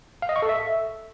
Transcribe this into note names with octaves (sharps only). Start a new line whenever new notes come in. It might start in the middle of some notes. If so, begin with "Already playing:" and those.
F5
D#5
C#6
A4
E5